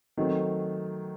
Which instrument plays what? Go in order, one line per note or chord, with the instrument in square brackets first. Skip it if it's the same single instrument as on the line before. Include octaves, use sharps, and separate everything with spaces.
[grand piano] D#3 F#3 A3 C4